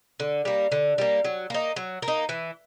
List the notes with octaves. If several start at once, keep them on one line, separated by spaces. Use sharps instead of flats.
D3
G3 A#3
D3
G3 A#3
F#3
A#3 D#4
F#3
A#3
D#4
E3